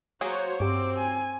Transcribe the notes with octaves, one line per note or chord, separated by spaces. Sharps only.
F#3 A#3 F#4 G#4 C5 C#5
G2 C4 G4 D6
G#5